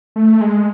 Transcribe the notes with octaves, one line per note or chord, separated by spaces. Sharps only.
A3
G#3